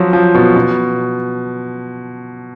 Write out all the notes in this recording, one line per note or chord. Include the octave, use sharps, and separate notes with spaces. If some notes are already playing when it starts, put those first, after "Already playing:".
Already playing: F3 F#3
F3
B2
B2